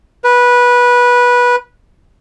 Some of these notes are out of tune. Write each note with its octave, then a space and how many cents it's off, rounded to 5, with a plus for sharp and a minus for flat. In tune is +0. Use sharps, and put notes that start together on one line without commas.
B4 -15